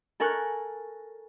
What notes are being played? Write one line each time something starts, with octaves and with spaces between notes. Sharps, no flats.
A4 A#4 G#5 C#6 F#6